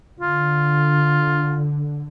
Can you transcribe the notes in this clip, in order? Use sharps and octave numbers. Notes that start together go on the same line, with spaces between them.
D3 F4